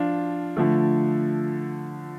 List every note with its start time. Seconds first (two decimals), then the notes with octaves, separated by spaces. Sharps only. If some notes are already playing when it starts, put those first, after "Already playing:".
Already playing: F3 D4 F4
0.56 D3 F3 A3